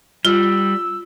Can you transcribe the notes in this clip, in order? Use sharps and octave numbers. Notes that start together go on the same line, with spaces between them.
G3 F4 E6